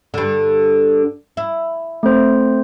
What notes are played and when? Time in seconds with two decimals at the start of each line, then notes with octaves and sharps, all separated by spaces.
0.14 G2 D3
1.37 E4
2.03 A3 C4 C5